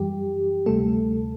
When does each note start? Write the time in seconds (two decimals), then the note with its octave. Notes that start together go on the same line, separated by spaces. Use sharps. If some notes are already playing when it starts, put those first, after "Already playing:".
Already playing: F#2 E3 G3 G4
0.66 D2 C3 G3 A3 A4